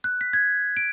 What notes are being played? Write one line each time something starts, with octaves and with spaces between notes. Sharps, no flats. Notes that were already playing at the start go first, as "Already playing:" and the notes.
F#6
B6
G#6
D7